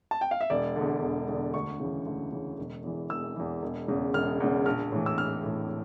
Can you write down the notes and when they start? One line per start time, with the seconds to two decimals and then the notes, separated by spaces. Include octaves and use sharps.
0.11 A5
0.21 G5
0.31 F5
0.41 E5
0.50 E1 D5
0.76 E2 D3
1.02 E1
1.28 E2 D3
1.54 D2 C#6
1.80 C#3 E3
2.06 D2
2.32 C#3 E3
2.58 E1
2.84 E2 E3
3.10 E1 E6
3.36 E2 E3
3.62 E1
3.88 E2 C#3
4.14 E1 F6
4.40 E2 C#3
4.66 A#1 F6
4.92 A2 E3
5.06 E6
5.18 A#1 F6
5.44 A2 E3